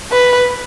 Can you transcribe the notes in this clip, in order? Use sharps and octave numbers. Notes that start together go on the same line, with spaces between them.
B4